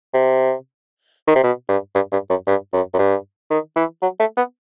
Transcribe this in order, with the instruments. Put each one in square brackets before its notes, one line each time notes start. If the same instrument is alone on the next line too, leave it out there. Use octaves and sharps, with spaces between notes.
[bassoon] C3
D#3
C3
B2
G2
G2
G2
F#2
G2
F#2
F#2
G2
D#3
E3
F#3
A3
B3